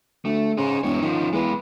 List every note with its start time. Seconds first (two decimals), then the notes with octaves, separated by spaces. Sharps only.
0.25 D2 A3
0.57 C#3 G#4 C5
0.83 E1 G2 C#5
1.02 D#3 F3 C#4
1.33 E2 G#3 B4